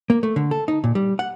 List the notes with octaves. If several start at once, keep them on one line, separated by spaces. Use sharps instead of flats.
A#3
A3
D3
A4
D#4
A#2
G3
F#5